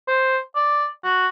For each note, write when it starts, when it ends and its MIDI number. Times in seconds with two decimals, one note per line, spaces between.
0.08 0.37 72
0.56 0.86 74
1.04 1.28 66